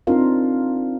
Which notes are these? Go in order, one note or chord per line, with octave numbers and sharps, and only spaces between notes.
C4 D4 D#4 F4 A#4 F5